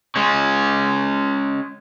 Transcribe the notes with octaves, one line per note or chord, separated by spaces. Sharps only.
G#3 C#4